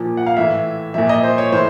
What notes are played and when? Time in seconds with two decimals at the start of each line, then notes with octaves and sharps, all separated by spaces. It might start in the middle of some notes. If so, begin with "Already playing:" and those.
Already playing: A#2 F3
0.17 F#5
0.26 F5
0.37 A2 E3 E5
0.94 A#2 F3 E5
1.09 D#5
1.23 C5
1.38 C#5
1.52 A2 E3 C5